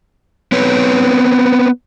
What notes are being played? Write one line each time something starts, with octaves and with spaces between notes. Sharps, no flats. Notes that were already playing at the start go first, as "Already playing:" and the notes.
B3 C4 B4 C#5